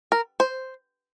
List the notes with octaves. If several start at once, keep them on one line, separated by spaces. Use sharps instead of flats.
A#4
C5